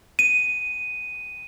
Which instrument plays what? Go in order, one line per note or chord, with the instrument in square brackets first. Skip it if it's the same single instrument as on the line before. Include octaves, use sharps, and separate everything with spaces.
[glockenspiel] D#7